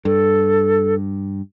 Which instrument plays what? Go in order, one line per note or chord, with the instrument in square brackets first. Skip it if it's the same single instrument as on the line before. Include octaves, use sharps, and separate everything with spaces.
[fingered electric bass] G2 [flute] A4